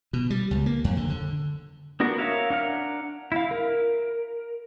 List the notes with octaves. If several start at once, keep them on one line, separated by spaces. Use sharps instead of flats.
B2
G3
C#2
A#3
F2
D3
D3
B3 D4 F#4 A#4
A#4 C#5 E5 F5
D4 F#5 A#5 F6
E4 F5
A#4